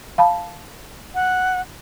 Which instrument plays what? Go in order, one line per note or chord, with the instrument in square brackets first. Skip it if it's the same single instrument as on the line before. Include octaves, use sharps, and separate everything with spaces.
[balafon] F5 A5 B5
[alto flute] F#5